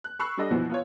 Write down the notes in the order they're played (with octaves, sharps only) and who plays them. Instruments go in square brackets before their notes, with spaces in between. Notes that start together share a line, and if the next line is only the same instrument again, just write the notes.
[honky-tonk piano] F#6
B5 C#6 E6 F#6 C7
G3 D4 G4 A4 D#5
B2 E3 F3 B3 F#4
B3 F4 C#5